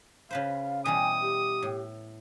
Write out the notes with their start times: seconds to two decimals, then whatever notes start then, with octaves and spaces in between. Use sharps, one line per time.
0.31 C#3 B4 C5 F5
0.86 B2 E3 G3 G#5 D#6
1.22 G4
1.63 A2